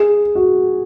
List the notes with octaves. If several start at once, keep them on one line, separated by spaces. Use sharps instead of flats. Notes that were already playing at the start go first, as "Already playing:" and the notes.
Already playing: G#4
F#4